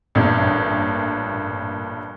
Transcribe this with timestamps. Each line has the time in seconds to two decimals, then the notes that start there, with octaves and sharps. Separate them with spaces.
0.15 A1 G2 A#2